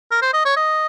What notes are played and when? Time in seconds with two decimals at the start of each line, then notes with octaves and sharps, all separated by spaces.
0.11 A#4
0.22 C5
0.33 D#5
0.45 C#5
0.57 D#5